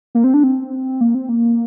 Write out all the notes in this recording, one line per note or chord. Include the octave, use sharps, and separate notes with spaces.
A#3
C4
D4
C4
A#3
C4
A#3